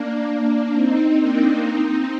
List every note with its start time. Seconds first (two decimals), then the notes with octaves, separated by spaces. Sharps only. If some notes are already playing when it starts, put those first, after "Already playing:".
Already playing: A#3 D4
0.27 A#3 D4
0.73 C4 D#4
1.20 A#3 D4
1.66 C4 D#4